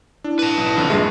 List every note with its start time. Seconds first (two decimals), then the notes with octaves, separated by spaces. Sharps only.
0.24 D4 E4
0.39 B4 A5
0.57 B1
0.77 F2 D3
0.90 G2 A#2 G#3 E5